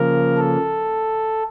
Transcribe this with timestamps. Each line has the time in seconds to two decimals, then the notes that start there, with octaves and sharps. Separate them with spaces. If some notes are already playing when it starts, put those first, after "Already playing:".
Already playing: C#3 F3 A#3 A#4
0.37 A4